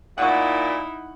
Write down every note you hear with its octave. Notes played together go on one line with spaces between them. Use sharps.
A#2 D#4 E4 F#5 C#6